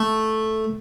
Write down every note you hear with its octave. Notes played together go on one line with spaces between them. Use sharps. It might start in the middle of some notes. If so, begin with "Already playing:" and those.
Already playing: A3